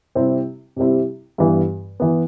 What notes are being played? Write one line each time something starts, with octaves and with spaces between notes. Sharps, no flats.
C3 G3 C4 E4
C3 G3 C4 E4
G2 E3 B3
E3 B3